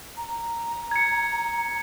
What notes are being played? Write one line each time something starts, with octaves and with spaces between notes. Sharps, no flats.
A#5
G#6 C#7